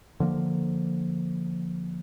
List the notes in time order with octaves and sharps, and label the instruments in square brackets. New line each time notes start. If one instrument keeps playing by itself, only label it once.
[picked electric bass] D3 F3 A#3